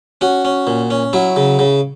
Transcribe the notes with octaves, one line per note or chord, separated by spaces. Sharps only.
C#4 F#4
C#4
A#2
C#4
F#3 E4
C#3
C#3